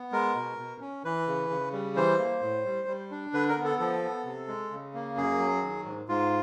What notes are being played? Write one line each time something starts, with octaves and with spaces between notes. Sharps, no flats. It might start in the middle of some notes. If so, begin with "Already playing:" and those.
Already playing: B3
G#3 A#4
B2
B2
C#4
E3 B4
C#3
C#3
G3
E3 C5
A#3
A2
G3
G3
D4
D3 B4
A#4
B3
A4
F3 A4
B3
C3
G#3
C#3
A#3
F#2 G#4
F#3
D#3
G#2
G#2 F4